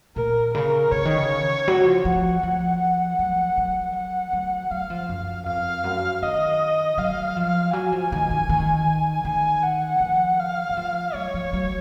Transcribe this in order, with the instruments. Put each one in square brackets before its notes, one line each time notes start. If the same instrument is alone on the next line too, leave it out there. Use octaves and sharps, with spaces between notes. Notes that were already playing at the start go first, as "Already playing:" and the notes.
[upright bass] A#2 [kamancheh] A#4
[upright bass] C#3 [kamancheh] A#4
[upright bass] C#3 [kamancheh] C#5
[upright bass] D#3
C#3
F#3
F3
[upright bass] F3 [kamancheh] F#5
[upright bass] F3
[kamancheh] F#5
[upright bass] F#3
F#3
[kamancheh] F#5
[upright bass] F#3
[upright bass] F#3 [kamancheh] F5
[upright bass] F3
F#2
[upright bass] F2 [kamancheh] F5
[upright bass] F#2
[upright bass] D#3 [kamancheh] D#5
[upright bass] F#3 [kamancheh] F5
[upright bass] F3
[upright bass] F#3 [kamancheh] G#5
[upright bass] F3
D#3
D#3
D#3
[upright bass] D#3 [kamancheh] G#5
[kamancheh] F#5
[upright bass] F3
[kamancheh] F5
[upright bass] F#3
F3
[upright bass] F#3 [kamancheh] C#5
[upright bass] F3
F#3